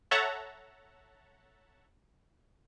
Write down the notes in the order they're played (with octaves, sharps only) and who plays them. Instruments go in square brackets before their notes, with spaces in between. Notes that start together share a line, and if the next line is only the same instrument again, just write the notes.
[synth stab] A4 C#5 E5 F#5 A5 A#5